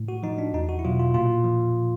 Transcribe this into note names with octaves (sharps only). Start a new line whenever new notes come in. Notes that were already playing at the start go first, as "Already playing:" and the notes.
Already playing: A2
F#4
F3 D#4
D4
E2 D#4
F#4
E4
B2 F#3 F4
F4
A#2 F4
F3